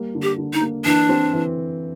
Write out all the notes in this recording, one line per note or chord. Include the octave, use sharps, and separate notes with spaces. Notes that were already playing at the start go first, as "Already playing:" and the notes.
Already playing: G3 A#3
D3
G4
D3
D#4
A#3
E3 D4
C4
E3